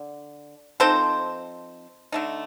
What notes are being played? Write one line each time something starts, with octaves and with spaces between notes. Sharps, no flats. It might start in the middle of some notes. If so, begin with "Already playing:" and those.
Already playing: D3
F3 C4 D#4 A4 C5
D3 A3 D#4